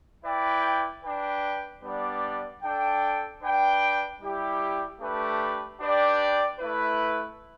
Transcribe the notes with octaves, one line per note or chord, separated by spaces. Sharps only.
E4 B4 D5 G5
D4 B4 G5
G3 B3 D4 B4 D5
D4 A4 G5
D4 B4 G5
G3 E4 G4
A3 D4 G4 B4
D4 G4 B4 D5 G5
A3 E4 B4